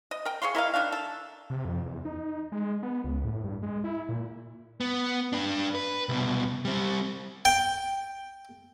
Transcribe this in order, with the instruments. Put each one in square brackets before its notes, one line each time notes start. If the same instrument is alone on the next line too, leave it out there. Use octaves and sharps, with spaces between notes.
[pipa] D#5
A#4 G5
G#4 C#5 F5 C6
E4 A#4 D#5 F5
D#3 C4 D4 F5
A4
[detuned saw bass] C3
F2
E2
D#4
G#3
B3
C#2
A2
G2
G#3
E4
A#2
[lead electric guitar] B3
D4 B4
B4
C2 B2
G3 C4
[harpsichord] G5